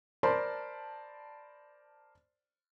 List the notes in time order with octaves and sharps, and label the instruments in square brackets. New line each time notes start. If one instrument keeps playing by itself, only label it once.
[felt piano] A#4 C5 D5 A5 B5 C6